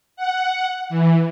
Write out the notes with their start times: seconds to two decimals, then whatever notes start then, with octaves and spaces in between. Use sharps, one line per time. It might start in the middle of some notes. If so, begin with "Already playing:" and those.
0.16 F#5
0.89 E3